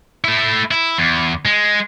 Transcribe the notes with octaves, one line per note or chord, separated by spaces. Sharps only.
A3 E4
E4
E2
G#3